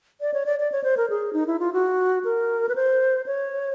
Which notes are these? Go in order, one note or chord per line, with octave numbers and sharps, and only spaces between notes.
D5
C#5
D5
D5
C#5
C5
A#4
G#4
D#4
E4
F4
F#4
A#4
B4
C5
C#5